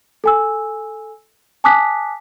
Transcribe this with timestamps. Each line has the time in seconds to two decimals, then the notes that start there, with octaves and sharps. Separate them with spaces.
0.24 A4 G#5 E6
1.64 G#5 A5 D6 D#6 F#6 B6